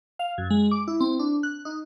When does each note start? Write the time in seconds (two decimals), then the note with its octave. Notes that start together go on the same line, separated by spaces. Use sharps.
0.19 F5
0.38 F#2
0.50 G#3
0.71 D6
0.88 E4
1.00 C4
1.19 D4
1.43 F#6
1.65 D#4